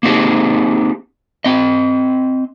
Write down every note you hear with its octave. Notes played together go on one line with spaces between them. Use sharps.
A#3 C4 D#4 G4 G#4
C4 D#5